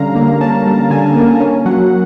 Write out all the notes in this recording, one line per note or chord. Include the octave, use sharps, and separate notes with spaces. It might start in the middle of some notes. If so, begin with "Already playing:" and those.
Already playing: D3 G3 C#4 F5 A#5
A#3
C#4 A5
G3
D3 G#5
A#3
C#4
F#3 F#5
F#5